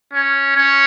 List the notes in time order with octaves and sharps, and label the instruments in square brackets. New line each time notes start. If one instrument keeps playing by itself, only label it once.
[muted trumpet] C#4
C#4